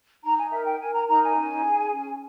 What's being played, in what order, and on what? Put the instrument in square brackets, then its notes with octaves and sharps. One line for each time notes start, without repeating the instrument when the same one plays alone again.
[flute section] D#4 A#5
G#5
A#4 E5
G5
A#4 G#5
A#5
D#4 A#5
G#5
C#4
G#4
C#4